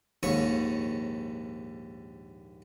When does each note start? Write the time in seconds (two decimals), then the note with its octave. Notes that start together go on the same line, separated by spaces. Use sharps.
0.23 A#1 D#2 G#2 C#5 C#6